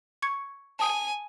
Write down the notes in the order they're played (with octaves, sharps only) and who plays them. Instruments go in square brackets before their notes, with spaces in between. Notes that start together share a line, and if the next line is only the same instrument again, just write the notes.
[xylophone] C#6 G#6 C#7
[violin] G#5 [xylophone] A5 D#6